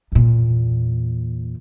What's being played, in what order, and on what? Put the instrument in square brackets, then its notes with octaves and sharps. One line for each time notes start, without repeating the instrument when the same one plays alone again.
[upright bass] E2 A#2